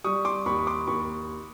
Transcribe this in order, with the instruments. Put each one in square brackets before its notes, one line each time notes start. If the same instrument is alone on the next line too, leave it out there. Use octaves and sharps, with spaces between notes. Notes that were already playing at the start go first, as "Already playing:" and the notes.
[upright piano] G3 C#6 D#6
C6 D6
D#2 B5 C#6
C#6
C6 D6
D#2 B5 C#6